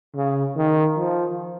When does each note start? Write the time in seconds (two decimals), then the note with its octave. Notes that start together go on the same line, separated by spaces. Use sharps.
0.15 C#3
0.56 D#3
0.97 F3